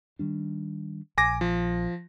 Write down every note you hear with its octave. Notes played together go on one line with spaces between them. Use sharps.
D#3 G3 D4
A#1 G#5 D6 A#6
F3